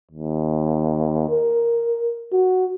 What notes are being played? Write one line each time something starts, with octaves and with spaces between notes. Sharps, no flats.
D#2
A#4
F#4